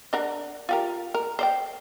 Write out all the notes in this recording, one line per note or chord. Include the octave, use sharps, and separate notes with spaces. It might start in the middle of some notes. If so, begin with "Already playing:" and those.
D4 A#4 F#5
F4 G4 A#4
A#4
C5 D5 G5